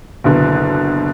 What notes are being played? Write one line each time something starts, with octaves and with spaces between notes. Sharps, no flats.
F#1 B2 D3